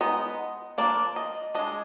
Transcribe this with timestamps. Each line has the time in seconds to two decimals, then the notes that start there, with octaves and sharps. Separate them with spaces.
0.01 G#3 B3 D#4 D#5
0.78 F3 A#3 D4 D5
1.16 D#5
1.55 G#3 D4 D#5